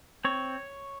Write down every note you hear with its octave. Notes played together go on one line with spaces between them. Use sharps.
C4 C#5